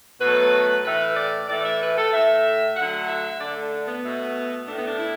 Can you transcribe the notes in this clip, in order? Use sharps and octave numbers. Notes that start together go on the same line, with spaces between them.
B2 F#3 A3 B4
A2 E3 A3 B4
D5
A2 E3 A3 D5
E5
B4
A4
A2 A3 E5
D3 F#3 A3 F#5
E5
D3 A3 D5
D4
D4
B3
B2 A3
A2 A3 D4
B3
D4
E4